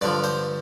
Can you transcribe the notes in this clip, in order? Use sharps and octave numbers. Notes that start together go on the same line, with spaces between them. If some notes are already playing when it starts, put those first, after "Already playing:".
G2 D3 F3 D5
C5